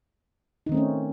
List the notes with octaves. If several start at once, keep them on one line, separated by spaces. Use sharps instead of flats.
D#3 A3 C4 C#4 D#4